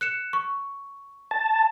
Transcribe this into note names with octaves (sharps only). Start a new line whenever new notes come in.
F#6 C#7 E7
C#6
A5